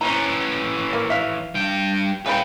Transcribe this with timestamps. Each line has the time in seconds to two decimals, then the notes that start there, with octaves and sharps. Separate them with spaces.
0.01 E3 C#4 C5 A#5
0.93 A#3
1.10 E5 F5
1.54 G2 G5
2.26 C#3 E3 B4 G5 B5